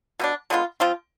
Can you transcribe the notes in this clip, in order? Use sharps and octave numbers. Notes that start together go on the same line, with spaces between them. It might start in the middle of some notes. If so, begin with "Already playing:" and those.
B2 B3 D4
D3 G#3 B3 F4
F3 C4 F4